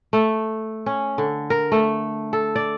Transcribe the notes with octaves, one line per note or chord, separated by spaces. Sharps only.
A3
C#4
D3
A#4
A3
A4
D5